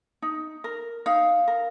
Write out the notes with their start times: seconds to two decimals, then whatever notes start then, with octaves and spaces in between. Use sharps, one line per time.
0.22 D#4
0.64 A#4
1.06 D#4 F5
1.48 A#4